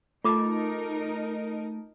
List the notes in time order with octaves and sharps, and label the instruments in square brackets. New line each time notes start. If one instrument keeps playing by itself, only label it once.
[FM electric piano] A3 A5 [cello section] D#4 A#4 [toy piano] F4 D6